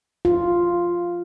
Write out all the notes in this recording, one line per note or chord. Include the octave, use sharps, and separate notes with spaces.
F4